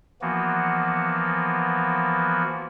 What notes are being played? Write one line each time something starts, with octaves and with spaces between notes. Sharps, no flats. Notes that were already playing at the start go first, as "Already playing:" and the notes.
E3 F3 A#3 B3 F#4